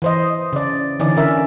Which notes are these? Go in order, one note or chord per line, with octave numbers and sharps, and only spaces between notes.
E3 C5 D#5
C#3 D5
D3 E3 C#4 D#4 D5
D3 C#4 A#4 E5